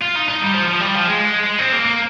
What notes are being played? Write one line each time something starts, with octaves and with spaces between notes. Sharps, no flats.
F4
D#4
D#4
G3
F3
F3
G3
F3
G#3
C4
A#3
A#3